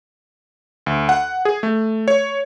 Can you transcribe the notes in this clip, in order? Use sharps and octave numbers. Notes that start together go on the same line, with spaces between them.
D2
F#5
G#4
A3
C#5